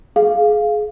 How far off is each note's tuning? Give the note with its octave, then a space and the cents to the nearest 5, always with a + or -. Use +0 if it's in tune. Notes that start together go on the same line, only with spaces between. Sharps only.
G#4 +25 F5 +0